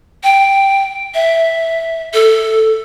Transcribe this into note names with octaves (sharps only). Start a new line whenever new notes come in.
G5
E5
A4